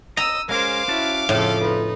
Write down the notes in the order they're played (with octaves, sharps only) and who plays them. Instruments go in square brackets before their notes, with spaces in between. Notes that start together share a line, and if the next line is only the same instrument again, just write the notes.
[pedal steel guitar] D#5 [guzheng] A#5 [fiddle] D#6 E6
[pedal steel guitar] G#3 C#4 G#4 [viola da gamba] A#4 C5 [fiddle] F5 D6
[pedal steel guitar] C#4 F#4 A5 [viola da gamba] E4
[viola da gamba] F2 C#3 A4 [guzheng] A2 [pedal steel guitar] F4
[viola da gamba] D#4 [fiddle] B4